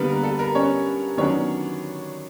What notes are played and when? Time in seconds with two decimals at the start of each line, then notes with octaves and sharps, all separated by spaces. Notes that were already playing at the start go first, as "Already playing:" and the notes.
Already playing: D3 G3 A#3 B3 B4
0.08 A#4
0.23 A4
0.39 A#4
0.55 C#4 C#5
1.17 D#3 F#3 B3 C#4 D4 C#5